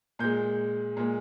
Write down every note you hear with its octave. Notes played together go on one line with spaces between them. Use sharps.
A#2 G#3 G6
A#2 G#3